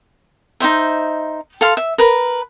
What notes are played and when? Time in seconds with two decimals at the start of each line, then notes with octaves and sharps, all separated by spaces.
0.60 D#4 F4 C5 E5
1.61 A4 F5 C6
1.77 E5
1.98 A#4 B4